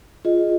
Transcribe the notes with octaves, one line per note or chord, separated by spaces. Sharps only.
F4 G#4 D#5